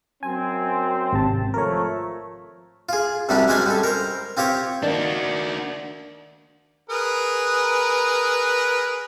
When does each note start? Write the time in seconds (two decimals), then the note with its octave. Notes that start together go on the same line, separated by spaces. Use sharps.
0.23 F#2 C4 G#5
1.13 G#1 C3 A5
1.54 F3 A3 A#4 C#5
2.89 F4 G#4
3.29 C2 C3 F#3 G3 D4 G4
3.48 F#3 G#3 C#4 C5 D5 G#5
3.66 G3 A4
3.83 A#4 C5
4.37 C4 F4 G4 C5 C#5
4.83 D#3 A#3 D4 F#4 D5
6.90 G#4 A#4 B4